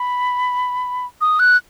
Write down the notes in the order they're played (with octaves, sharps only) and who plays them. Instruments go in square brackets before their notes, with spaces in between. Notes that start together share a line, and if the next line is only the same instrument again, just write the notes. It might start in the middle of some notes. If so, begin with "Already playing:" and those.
Already playing: [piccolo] B5
D#6
F#6